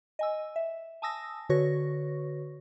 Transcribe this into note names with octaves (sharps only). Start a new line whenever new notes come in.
D#5 G#5 E6
E5
G#5 A5 D#6 E6 A#6
D3 F#4 B4 C#5 C#6 A#6